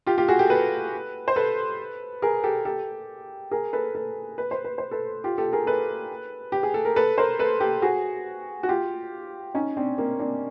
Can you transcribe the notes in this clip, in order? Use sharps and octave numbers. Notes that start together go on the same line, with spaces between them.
F4 G4
F4 G4
F#4 G#4
G4 A4
A4 B4
C5
A4 B4
G#4 A#4
G4 A4
G4 A4
G#4 A#4
A4 B4
A4 B4
B4
C5
B4
C5
A4 B4
F4 G4
G4 A4
G#4 A#4
A4 B4
G4
G#4
A4
A#4
A4 B4
A#4 C5
A4 B4
G4 A4
F#4 G#4
F#4
F4 G4
C#4 D#4
C4 D4
A#3 C4
C4 D4